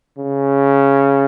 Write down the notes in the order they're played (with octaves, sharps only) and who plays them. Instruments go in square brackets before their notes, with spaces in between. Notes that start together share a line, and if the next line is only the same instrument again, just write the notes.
[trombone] C#3